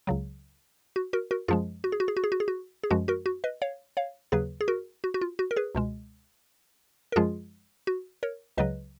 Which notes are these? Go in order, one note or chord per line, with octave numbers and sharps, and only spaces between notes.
C#2 C#3 F#3
F#4
F#4 A#4
F#4 A#4
F#2 F3 G#3 F4 G#4
F#4
G#4
F#4
G#4
F#4
G#4
F#4
G#4
F#4
G#4
F#2 F3 G#3 F#4
F#4 A#4
F#4
B4 D#5
C#5 F5
C#5 F5
D#2 C#3 F#3 G#4 B4
G#4
F#4 A#4
F#4
F#4
F4
F#4
A#4
G#4 B4
C#2 B2 G#3
A#4
F#2 F3 G#3 F4 G#4
F#4
A#4 C#5
C#2 C#3 F#3 B4 D#5